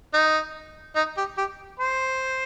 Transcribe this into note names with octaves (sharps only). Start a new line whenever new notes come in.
D#4
D#4
G4
G4
C5